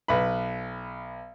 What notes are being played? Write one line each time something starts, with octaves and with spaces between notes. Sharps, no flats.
B1 B4 B5